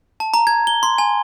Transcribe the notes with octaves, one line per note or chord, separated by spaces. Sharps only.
A5
A#5
G#6
G7
C6
G#5